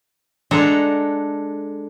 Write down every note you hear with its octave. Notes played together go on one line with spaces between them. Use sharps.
G#3 D4 A4 F#5 A#5